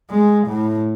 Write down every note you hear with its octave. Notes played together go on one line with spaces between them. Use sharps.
G#3
A2